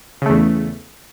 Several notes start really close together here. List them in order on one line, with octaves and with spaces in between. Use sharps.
C#3 A3 E2